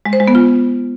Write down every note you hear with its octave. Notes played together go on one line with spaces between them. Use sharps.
G#3
C5
G#3
B3
F4